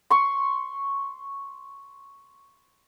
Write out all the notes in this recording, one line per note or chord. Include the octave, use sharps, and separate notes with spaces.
C6 C#6